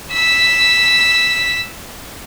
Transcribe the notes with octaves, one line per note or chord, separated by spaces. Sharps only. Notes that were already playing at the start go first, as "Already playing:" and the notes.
E6 B6